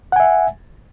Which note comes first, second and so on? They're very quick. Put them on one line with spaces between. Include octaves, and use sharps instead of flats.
F#5 G#5 E5